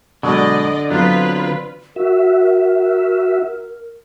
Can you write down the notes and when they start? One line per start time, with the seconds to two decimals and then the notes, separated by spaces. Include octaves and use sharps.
0.23 B2 D3 F#3 G#3 D5 D#5
0.90 F#3 B3 C4 D4 F4 B4
1.96 F#4 A#4 E5